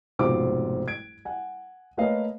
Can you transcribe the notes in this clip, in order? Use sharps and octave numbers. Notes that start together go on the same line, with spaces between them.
F1 G#2 B2 C4 F4 D6
G#6 D7
F#5 G#5
A3 A#3 B4 C#5 D#5 F5